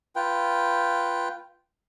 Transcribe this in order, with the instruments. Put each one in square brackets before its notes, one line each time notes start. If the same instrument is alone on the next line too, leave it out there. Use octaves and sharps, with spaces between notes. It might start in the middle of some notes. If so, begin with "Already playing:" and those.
[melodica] F4 B4 G5